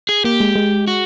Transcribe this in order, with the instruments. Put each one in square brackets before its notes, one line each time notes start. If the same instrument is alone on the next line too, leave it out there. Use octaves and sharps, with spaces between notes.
[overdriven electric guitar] G#4
[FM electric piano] A#3 [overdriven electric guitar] G4
[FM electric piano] G#3
G#3
[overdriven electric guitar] F#4